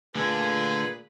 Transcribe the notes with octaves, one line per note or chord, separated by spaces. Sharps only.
A#2 D3 A3 G#4 B4 G#5 B5